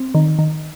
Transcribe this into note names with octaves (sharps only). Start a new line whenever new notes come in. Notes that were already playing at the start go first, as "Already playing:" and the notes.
Already playing: C4
D#3
D#3